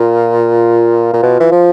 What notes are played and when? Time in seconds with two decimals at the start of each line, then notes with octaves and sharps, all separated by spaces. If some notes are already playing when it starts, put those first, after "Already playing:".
Already playing: A#2 F4
1.13 A#2
1.23 B2
1.40 E3
1.52 F3